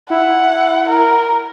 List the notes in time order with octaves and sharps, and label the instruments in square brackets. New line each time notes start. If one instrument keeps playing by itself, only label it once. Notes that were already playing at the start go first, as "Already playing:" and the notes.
[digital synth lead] E4 [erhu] F#5
[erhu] A#4